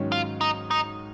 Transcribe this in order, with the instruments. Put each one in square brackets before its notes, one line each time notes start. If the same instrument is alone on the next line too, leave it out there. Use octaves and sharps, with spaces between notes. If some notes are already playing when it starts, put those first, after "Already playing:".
Already playing: [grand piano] G#2 D#3 F#3 C#4
[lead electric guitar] F4
D#4
D#4